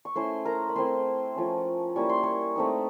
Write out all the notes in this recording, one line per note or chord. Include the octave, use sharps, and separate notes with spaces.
C#6
A3 C#4 E4 C5 C6
A#4 A#5
B5
A3 C4 E4 C5 C6
F3 A3 C#4
G3 A#3 C#4 E4 C#6
C6
C#5 C#6
A3 C4 D#4